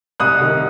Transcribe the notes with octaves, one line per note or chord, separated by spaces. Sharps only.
C2 D#6 F#6
C3 D#3